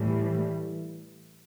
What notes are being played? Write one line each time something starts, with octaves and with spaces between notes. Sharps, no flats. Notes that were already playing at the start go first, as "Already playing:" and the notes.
Already playing: A2 E3 G3